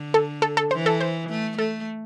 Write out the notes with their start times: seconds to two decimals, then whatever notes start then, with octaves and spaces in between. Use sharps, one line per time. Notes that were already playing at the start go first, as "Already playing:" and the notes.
Already playing: D3
0.14 A4
0.42 A4
0.57 A4
0.71 E3 C5
0.86 A4
1.00 C5
1.30 A3
1.57 A3 A4